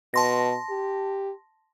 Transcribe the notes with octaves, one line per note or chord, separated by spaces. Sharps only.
B2 A5 C6 A#6
G4